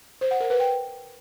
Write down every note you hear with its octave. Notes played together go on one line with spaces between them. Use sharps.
C5
F#5
A#4
B4
G5